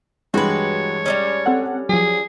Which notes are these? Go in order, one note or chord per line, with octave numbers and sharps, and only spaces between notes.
G2 E3 G#3 F#4 B4 C#5
G3 B3 C#4
C4 A4 F#5
F3 F#3 G#4